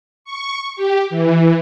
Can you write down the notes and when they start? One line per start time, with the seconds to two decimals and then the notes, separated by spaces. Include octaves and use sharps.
0.24 C#6
0.76 G4
1.10 E3